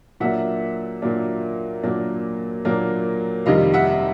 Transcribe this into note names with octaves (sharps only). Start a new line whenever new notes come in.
A#2 F#3 A#3 D4 E5 F#5
A#2 F#3 A#3 D4
A#2 F#3 A#3 D4
A#2 F#3 A#3 D4
F2 C3 D#3 G3 D#5 F5
E5 F#5